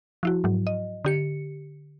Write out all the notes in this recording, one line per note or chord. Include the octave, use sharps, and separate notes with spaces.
F3 E4 F#4
G#2 F#3
D#5
D3 G4 C#7